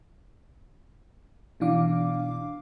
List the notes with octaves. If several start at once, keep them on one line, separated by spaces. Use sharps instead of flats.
B2 E3 D4 F5 D6